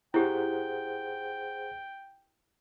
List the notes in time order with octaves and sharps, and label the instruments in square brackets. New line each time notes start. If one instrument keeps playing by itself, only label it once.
[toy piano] E4 G4 [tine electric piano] G#4 C5 F#5 [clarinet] G5